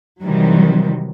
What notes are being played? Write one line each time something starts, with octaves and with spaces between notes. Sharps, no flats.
C3 D#3 E3 F#3 G3